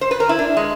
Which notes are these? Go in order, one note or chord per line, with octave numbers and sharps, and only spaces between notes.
C5
B4
A#4
E4
D4
G#3